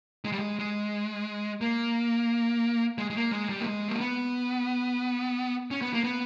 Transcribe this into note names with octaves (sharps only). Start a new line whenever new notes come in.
G#3
G3
G#3
G#3
A#3
G#3
G#3
A#3
G#3
G3
A#3
G#3
A#3
B3
C#4
B3
A#3
B3